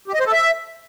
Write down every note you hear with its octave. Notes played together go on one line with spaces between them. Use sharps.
G4
D#5
C5
A4
E5